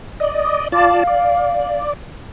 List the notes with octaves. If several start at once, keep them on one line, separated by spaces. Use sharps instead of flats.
D5 D#5
F4 D5 F5 A5
D5